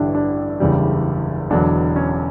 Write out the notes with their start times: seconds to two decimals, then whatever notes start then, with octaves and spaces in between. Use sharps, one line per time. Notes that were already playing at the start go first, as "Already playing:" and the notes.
Already playing: A1 G2 D3 G3 D4 E4
0.15 D4
0.60 F#1 E2 C#3 G3
1.50 E1 E2 D3 F#3 D4
1.96 C#4